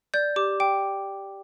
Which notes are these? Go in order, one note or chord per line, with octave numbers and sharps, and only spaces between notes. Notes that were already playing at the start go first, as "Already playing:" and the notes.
D5 G6
G4 D6
G5 D6